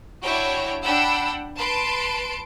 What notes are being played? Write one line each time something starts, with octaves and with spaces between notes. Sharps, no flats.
D4 E4 F#4 C#5 G5
D4 F#5 G5 B5 E6
B4 A5 C6 D7